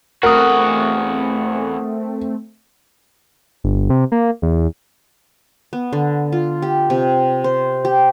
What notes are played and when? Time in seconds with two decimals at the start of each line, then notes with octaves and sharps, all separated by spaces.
0.23 E2 A3 C4 F#4 A#4 F#5 D#6
3.64 G1
3.90 C3
4.12 A#3
4.42 E2
5.73 B3
5.93 D3
6.32 F4
6.62 G4
6.90 C3
7.44 C5
7.85 G4